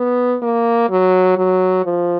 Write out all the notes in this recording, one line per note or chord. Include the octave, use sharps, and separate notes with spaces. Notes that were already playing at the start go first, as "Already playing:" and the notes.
Already playing: B3
A#3
F#3
F#3
F3